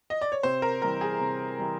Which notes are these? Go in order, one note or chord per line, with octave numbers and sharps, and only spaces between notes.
D#5
D5
C#5
C3 C5
A#4
E3 G3 A#4
G#4
C3
E3 G3